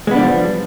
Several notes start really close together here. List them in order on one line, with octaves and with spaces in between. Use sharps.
G#3 B3 D4 G3 F3